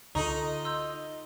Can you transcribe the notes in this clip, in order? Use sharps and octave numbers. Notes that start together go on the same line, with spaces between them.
C#2 D3 D#4 F4 A4 D#5 C#6
C6 E6 G6